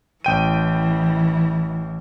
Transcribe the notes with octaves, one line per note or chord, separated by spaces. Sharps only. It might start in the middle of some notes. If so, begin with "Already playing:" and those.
A1 E3 G5 D#7